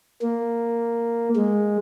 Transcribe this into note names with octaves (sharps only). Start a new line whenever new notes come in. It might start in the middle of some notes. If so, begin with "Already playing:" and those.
A#3
G#3